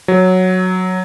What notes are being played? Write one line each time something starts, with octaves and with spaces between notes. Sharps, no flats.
F#3